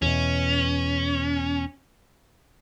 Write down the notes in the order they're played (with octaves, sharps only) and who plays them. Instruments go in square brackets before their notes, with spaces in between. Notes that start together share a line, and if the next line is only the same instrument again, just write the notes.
[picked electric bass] E2 B2 [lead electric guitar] C#4